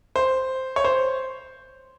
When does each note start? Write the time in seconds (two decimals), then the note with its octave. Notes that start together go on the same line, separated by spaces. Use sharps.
0.16 C5
0.76 C#5
0.84 C5